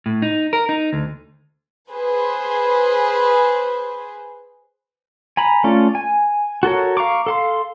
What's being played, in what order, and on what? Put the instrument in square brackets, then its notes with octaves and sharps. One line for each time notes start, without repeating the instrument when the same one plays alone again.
[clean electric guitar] A2
D#4
A#4
D#4
D2
[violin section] G#4 B4 C5
[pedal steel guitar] G#5 A#5 B5
A3 C#4 F4 A4 D5
G#5
F#4 A4 A#4 C#5
F5 A#5 C#6 D6
A4 F5 C6